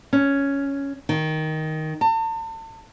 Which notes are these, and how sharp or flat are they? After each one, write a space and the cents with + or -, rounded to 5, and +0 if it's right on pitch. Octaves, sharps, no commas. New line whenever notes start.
C#4 +5
D#3 +5
A5 +40